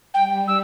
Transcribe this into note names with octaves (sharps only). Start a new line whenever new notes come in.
G3 G5
E6